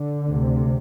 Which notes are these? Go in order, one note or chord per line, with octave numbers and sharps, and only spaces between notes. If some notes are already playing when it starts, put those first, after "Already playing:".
Already playing: D3
D2 C3